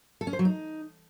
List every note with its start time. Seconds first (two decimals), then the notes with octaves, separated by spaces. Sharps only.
0.21 A4
0.27 C#4
0.33 C5
0.39 F#3
0.45 D#4